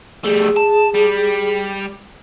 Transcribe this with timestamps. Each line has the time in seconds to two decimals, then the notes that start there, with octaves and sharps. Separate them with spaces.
0.24 G3 A3 G#4
0.57 A5
0.95 G3